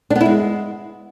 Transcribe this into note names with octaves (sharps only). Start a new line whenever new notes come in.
D4
B3
E4
G#3